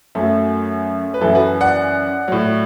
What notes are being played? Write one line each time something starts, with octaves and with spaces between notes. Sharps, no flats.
F#2 F#3 A3
B4
F#2 E3 E4 A4
F#4 B4
D5 F#5
A2 F#3